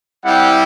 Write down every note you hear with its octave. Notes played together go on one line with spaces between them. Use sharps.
G3 C4 E4 G4 F#5